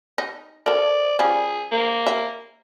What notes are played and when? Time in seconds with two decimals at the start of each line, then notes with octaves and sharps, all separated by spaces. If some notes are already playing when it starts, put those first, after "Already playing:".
0.18 D#4
0.66 A4 A#4 D5
1.19 F3 G3 C#4 G#4
1.72 A#3
2.06 E5